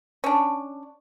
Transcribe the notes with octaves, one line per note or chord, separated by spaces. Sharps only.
C#4 D4